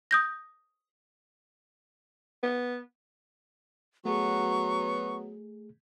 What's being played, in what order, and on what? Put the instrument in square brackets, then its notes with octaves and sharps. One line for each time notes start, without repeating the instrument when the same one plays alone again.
[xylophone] D#6 G6 A#6
[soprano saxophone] B3
[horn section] F#3 B3 [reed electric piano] A3 G#4 [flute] C#6